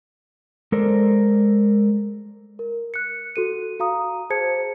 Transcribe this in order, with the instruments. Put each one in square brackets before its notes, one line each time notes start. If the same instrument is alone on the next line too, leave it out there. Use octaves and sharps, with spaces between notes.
[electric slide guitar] G#3 A4 A#4 C5 D5
[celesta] A#4
F#6 C#7
F#4 A4 D#7
F#4 F5 A#5 D#6
G#4 C5 A5 G#6 C#7